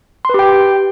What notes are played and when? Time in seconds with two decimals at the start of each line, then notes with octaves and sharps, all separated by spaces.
0.25 C6
0.29 B4
0.34 G4
0.39 G5